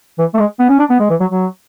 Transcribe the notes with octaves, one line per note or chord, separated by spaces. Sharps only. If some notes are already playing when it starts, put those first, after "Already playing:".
E3
A3
G#3
B3
C#4
D4
B3
G#3
E3
F#3
F#3